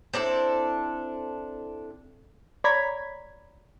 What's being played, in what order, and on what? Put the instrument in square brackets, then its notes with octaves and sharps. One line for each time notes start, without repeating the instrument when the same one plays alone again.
[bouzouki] C4 D4 E4 A4
[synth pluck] C#5 D5 A#5 B5 G#6 B6